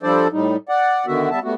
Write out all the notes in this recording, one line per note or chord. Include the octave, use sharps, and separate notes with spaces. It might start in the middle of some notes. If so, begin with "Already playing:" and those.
F3 G3 D4 A4 C5 D5
A2 G3 D#4
D5 F#5
D3 D#3 B3 F#4 E5
G3 B3 E5 A5
G3 A3 B3 F#4